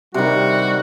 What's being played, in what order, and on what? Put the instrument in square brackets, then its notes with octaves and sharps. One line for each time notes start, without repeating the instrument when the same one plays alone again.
[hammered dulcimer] C3 D#3 [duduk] G3 [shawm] F#4